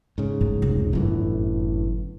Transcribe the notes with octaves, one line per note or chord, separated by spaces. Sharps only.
G#2 C#3
E2 A2
F1 C2
G1 F#2 A2 D3 E3